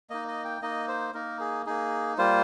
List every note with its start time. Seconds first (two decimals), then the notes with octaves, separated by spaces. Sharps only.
0.10 A#3 D#4 D#5
0.28 D#5
0.45 G5
0.62 A#3 D#4 D#5
0.88 C5
1.14 A#3 D#4 A#4
1.40 G#4
1.66 A#3 D#4 G#4
2.18 G3 A#3 F4 C5